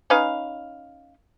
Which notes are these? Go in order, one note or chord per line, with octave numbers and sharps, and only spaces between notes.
C#4 D#4 B4 F5